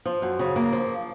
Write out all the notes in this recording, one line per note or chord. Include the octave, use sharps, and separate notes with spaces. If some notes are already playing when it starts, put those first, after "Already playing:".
F3
F#2
C#3
A#3
F3